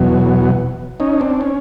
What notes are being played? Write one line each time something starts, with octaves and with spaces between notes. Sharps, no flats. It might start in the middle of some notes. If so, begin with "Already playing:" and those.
Already playing: E2 B2 F#3
C#4 D#4
C4 D4
C#4